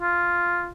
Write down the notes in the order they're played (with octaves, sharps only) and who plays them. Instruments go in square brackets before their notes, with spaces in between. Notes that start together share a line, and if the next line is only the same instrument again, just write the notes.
[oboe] F4